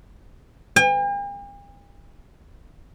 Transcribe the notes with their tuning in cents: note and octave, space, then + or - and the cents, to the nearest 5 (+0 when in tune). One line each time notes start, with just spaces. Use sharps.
G5 +45